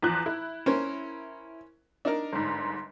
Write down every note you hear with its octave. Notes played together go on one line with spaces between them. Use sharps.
E2 F3 F#6
E4
C#4 A#4 C5
D4 D#4 A#4
G1 G#2